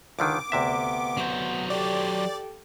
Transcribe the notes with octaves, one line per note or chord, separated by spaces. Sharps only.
C#2 D3 D#3 D6
D2 C3 B3 E5
F#3 C5
G4 A4 D5